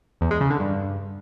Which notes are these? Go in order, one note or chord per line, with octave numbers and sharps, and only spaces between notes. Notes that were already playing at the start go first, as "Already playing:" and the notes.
E2
G#3
C#3
D3
G2